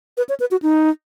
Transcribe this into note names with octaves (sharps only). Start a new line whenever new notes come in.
B4
C#5
B4
F#4
D#4